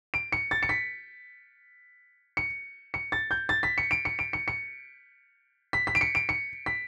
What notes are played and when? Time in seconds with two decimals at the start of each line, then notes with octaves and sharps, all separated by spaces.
0.14 D7
0.32 C#7
0.51 A6
0.63 C#7
0.69 B6
2.37 C#7
2.94 C#7
3.12 A6
3.31 G6
3.49 A6
3.63 B6
3.78 C#7
3.91 D7
4.05 C#7
4.19 D7
4.33 C#7
4.48 C#7
5.73 B6
5.87 B6
5.95 D7
6.01 C#7
6.15 D7
6.29 C#7
6.66 B6